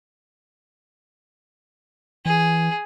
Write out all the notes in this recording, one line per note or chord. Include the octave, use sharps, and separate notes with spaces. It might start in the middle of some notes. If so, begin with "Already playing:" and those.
E3 G#4